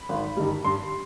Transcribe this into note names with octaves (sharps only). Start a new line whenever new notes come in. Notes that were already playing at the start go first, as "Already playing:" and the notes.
Already playing: B5
G#1
G2 D#3 G3
G2 C6